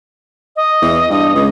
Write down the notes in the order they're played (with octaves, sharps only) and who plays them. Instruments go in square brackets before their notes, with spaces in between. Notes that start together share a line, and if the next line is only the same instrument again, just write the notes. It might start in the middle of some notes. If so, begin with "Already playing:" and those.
[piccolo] D#5
[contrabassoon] E2
G2
C#2